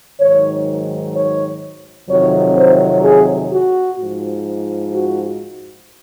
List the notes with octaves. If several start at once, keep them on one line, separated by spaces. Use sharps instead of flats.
G#2 D#3 F#3 C#5
C#5
F2 C3 D#3 F#3 C#5
C5
G#4
F#4
G#2 F3
F#4